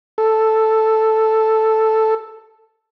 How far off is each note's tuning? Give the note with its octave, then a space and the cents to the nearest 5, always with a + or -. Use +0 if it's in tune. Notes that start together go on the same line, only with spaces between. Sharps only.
A4 +0